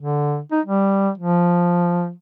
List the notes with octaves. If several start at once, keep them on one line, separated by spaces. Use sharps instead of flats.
D3
D#4
G3
F3